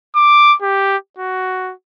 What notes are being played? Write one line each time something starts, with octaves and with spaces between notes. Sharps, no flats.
D6
G4
F#4